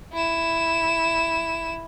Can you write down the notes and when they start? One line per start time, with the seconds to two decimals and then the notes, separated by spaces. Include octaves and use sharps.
0.13 E4 E7